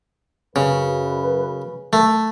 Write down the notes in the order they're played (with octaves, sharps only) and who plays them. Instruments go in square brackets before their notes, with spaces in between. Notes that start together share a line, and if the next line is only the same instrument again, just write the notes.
[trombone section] F#2 B4 [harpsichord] C#3
[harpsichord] A3